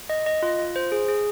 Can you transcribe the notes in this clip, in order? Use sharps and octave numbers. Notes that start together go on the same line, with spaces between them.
D#5
D#5
F4
F4
C5
G#4
G#4